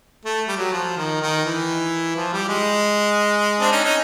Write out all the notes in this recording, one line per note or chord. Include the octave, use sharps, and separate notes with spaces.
A3
G3
F#3
F3
D#3
D#3
E3
F3
G3
G#3
C4 D4
C#4 D#4
C#4 D#4